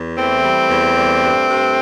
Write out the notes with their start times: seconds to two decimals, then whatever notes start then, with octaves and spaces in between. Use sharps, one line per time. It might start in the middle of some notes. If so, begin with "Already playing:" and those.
Already playing: E2
0.16 E3 A3 C4
0.43 G3
0.69 E2
0.95 G3
1.22 G2
1.48 G2